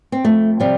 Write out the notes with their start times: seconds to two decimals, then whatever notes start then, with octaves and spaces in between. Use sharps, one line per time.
0.12 C4
0.24 F2 A3
0.60 C3 F3 G3